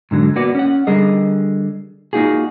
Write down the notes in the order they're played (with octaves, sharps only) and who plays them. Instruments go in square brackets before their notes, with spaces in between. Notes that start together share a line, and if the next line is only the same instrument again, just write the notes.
[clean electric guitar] G#2 D3 F#3
A#3 B3 F#4 D5
C#4 F#5
D3 G3 G#4 A#4 D#5
A#3 D#4 F4 F#4 G#4